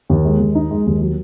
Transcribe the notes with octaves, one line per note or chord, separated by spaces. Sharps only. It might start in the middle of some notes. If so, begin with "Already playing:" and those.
D#2
G#3
D#2
D#4
G#3
D#2
F#3